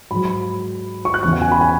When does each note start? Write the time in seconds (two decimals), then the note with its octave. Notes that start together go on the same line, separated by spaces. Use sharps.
0.11 G#2 F#3 B5
0.25 B5
1.05 C#6
1.14 F#6
1.23 E2 C#3 E3 C#6
1.33 F#5
1.42 G#5
1.52 B5
1.61 G#5